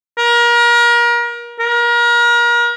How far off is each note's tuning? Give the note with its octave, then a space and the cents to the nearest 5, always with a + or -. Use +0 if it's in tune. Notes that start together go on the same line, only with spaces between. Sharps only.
A#4 +30
A#4 +35